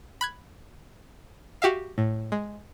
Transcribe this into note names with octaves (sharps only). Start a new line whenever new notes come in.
B5 F#6 G#6
F#4 G4 E5 F5
A2
G#3